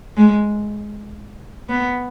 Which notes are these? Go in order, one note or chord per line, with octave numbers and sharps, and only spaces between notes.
G#3
B3